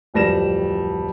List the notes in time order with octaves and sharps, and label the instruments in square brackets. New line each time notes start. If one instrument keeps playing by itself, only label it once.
[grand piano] D1 F2 G3 A#6 E7